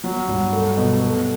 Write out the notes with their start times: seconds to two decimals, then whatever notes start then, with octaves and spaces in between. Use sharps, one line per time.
0.04 F#3
0.28 G2
0.53 A3
0.77 B2
1.00 A3